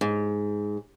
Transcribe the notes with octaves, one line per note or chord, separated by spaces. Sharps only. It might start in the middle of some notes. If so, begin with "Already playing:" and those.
G#2